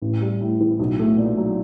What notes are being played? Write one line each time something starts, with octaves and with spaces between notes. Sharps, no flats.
A1
G3
A2
E3
B1
A3
A#2
F#3